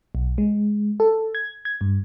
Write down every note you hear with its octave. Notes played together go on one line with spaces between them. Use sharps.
B1
G#3
A4
G#6
G#6
G2